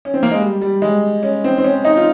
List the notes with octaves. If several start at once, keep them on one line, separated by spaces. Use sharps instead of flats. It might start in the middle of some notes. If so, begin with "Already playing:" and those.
C#4
C4
A#3
G#3
G3
G3
G#3
C#4
C4
C4
C#4
D#4
F4